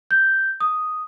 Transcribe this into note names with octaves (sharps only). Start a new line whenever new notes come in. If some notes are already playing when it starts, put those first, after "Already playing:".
G6
D#6